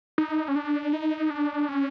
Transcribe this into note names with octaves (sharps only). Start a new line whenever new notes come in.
D#4
C#4
D4
D#4
D4
C#4